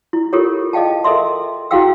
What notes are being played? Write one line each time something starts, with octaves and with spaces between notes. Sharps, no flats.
E4
F4 G4 A4 A#4 C#5
G#4 D#5 F5 G5 A5
A4 A#4 D#5 E5 C6
E4 F#4 G#4 F5 G5 E6